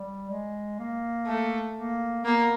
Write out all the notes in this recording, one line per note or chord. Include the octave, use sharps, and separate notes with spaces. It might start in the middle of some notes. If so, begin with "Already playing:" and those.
Already playing: G3
G#3
A#3
A3
A#3
A#3 B3